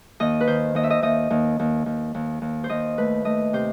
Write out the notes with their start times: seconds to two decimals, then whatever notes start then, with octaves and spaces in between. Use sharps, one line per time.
0.20 D#2 D#5
0.41 B4
0.47 D#3 C5
0.75 D#2 D#5
0.83 E5
0.90 D#5
1.02 D#2 D#5
1.30 D#2
1.59 D#2
1.86 D#2
2.14 D#2
2.42 D#2
2.64 C5
2.69 D#2 D#5
2.98 A3 B4
3.25 A3 D#5
3.53 C3 C5